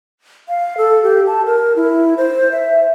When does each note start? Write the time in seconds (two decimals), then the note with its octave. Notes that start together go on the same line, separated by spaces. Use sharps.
0.49 F5
0.77 A4
1.03 G4
1.27 A5
1.46 A#4
1.76 E4
2.17 C5
2.52 E5